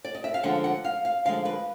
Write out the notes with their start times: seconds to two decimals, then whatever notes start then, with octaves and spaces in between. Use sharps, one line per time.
0.05 D5
0.15 D#5
0.24 E5
0.34 F5
0.43 D3 F3 G#3 F#5
0.64 F#5
0.85 F5
1.05 F5
1.25 D3 F3 G#3 F5
1.45 B4